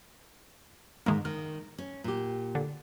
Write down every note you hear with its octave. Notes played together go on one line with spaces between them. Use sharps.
G#2 D#3 G#3 A#3
D#3 F6
C#4
A#2 G4
D3